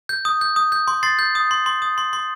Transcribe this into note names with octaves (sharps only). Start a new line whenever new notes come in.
G6
D#6
G6
D#6
G6
C6
C6 A6 C7
G6
D#6
C6
C6
D#6
C6
C6